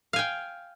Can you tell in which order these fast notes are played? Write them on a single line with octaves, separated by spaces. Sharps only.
F5 G#5 G5